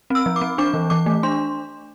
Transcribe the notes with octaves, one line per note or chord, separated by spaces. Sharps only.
C4 E6
F3
D6
C4
D4 D6
E3
E3 D6
A3
D4 C6